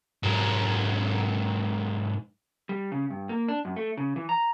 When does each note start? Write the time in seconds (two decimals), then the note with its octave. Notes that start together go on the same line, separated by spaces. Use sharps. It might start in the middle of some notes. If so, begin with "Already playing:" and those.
0.23 G#2 F#3
2.69 G3
2.92 C#3
3.10 G2
3.29 A#3
3.48 D4
3.65 F#2
3.76 A3
3.97 C#3
4.16 E3
4.29 A#5